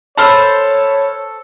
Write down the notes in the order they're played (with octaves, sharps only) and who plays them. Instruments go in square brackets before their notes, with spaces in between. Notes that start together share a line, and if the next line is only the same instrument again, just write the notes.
[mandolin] A4 C5 E6 [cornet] C#5 [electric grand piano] A5 B5 F6